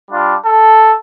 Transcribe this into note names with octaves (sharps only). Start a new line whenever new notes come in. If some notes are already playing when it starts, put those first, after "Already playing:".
G3 D4 F4
A4